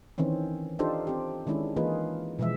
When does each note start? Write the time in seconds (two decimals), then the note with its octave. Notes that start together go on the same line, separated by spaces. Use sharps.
0.18 D#3 E3 C4 C#4
0.79 D4 D#4 F4 G4 A4 C5
1.07 C4 G4
1.47 D#3 G#3 C#4 D4 E4
1.76 E3 A#3 D#4 F4 G#4 B4
2.39 B2 E3 F3 G#3 E5